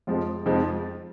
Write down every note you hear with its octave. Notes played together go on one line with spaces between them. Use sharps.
F2 F3 G#3 F4
F2 F3 G#3 D#4
F4